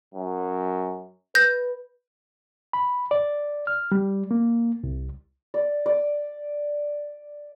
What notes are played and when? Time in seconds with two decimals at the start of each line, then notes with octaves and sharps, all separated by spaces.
0.14 F#2
1.35 B4 G6 A#6
2.73 B5
3.11 D5
3.67 F6
3.92 G3
4.31 A#3
4.84 C2
5.54 D5
5.86 D5